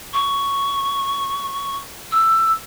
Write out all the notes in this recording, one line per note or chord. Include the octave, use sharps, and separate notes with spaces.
C#6
E6